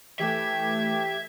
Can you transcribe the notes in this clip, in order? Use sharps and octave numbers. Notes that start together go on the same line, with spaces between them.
E3 A3 G4 E5 G#6